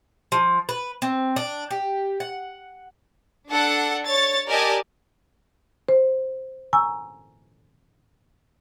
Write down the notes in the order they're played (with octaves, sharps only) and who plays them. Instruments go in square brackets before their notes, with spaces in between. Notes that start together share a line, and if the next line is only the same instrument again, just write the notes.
[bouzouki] F3
B4
C4
D4
G4
F#5
[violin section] D4 A4 F#5
C#5 A6
G4 A#4 D5 D#5 G#5 A5
[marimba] C5
G#5 A#5 C#6 E6